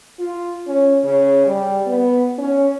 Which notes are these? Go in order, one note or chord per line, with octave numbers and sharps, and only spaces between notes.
F4
C#4
C#3
G3
B3
C#4